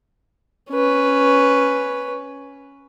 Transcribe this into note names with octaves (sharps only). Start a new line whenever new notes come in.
C#4 B4